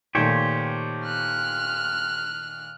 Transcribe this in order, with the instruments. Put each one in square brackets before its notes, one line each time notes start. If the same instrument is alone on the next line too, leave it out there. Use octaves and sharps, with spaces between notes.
[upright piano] A#2 D#3 A3 [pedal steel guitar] G4 C5 C#5
[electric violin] F6 F#6